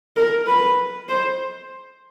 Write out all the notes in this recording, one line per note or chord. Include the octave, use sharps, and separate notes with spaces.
A#4
B4
C5